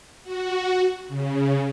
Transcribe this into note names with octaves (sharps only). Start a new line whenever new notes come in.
F#4
C#3